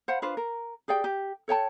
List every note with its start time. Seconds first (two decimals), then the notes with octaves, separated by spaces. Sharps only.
0.08 C5 F5 F#5 B5
0.22 D4 F4 B4 C5
0.37 A#4
0.88 G4 G#4 D5 G5
1.04 G4
1.48 A4 C#5 G5 A5